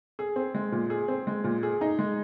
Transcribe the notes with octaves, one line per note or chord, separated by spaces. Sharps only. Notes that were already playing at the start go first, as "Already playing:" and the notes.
G#4
C4
G#3
A#2
G#4
C4
G#3
A#2
G#4
D#4
G#3